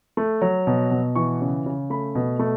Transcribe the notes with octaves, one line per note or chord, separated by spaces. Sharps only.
A3
F#3
B2
B2
E3 C#6
C#3
C#3
A3 B5
B2
A3